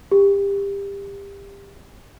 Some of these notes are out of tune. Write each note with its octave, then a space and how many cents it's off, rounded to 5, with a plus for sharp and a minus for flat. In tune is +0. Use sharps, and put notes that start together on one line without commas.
G4 +25